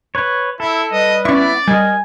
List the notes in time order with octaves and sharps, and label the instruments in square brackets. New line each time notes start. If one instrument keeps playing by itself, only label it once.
[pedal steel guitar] B4 C#5
[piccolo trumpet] E4 [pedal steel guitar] A4
[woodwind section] G3 B4 [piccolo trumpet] D#5
[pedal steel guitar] B3 E4 [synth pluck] C#4 C#6 [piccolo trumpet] D5
[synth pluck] G3 [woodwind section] A#4 D#5 [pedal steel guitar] G#5